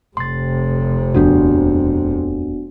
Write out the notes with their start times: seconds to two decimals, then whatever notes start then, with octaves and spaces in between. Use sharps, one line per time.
0.17 F1 C3 C6 A6
1.15 D#1 F2 B3 D4 F#4